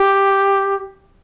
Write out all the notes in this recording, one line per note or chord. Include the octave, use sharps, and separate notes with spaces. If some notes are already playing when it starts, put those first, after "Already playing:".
Already playing: G4